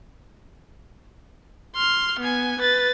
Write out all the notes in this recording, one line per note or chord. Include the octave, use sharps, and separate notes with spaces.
C6 F6
B3 G#5
B4 A6